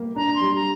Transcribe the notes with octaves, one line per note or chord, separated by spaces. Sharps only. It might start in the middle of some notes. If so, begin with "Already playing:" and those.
Already playing: G3 A#3 G4
D4 A#5
C6
G3
A#5